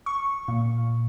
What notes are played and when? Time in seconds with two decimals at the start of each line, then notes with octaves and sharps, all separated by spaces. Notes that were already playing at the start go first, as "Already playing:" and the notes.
0.06 C#6
0.48 A#2